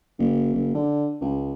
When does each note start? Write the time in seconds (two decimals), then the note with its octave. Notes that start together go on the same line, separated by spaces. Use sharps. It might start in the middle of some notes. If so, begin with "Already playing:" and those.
0.19 F#1
0.53 F#1
0.75 D3
1.21 C#2